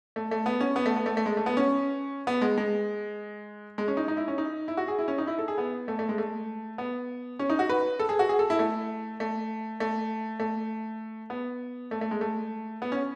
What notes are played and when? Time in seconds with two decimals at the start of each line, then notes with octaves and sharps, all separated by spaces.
0.16 A3
0.31 A3
0.46 B3
0.61 C#4
0.76 B3
0.86 A3
0.96 B3
1.06 A3
1.17 A3
1.26 G#3
1.37 A3
1.46 B3
1.57 C#4
2.27 B3
2.42 G#3
2.58 G#3
3.78 G#3
3.88 C#4
3.97 D#4
4.08 D#4
4.17 E4
4.28 C#4
4.38 D#4
4.68 E4
4.77 F#4
4.88 G#4
4.99 E4
5.08 C#4
5.18 D#4
5.27 E4
5.39 A4
5.48 G#4
5.58 B3
5.88 A3
5.99 A3
6.09 G#3
6.18 A3
6.78 B3
7.39 C#4
7.49 D#4
7.59 F#4
7.70 B4
7.99 A4
8.09 G#4
8.19 F#4
8.29 G#4
8.39 A4
8.50 E4
8.59 A3
9.20 A3
9.80 A3
10.40 A3
11.30 B3
11.91 A3
12.01 A3
12.11 G#3
12.21 A3
12.82 B3
12.92 C#4